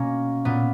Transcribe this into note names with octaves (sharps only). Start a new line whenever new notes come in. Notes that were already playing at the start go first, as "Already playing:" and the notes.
Already playing: B2 A#3 C#4
A#2 B3